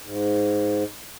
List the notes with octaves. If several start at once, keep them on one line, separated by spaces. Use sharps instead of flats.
G#2